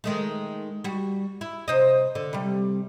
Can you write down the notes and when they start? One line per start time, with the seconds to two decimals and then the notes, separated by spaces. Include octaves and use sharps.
0.04 D#3 G#3 A3
0.84 G3 F#4
1.41 E4
1.68 C3 C5 D#5
2.15 D3
2.33 C3 G3